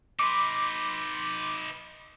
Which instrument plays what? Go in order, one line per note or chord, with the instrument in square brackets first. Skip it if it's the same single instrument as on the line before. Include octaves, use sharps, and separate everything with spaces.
[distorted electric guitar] D#4 B4 [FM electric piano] C6 D6